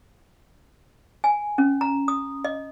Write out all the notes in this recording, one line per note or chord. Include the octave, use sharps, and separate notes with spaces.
G#5
C#4
A#5
D#6
D#5